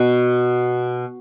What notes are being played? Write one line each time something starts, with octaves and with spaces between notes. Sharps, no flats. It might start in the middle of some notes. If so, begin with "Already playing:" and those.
Already playing: B2